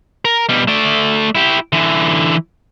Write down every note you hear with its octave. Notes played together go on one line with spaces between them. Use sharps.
A#4
B2 G3
A3 D5
E4 G4
D3 E3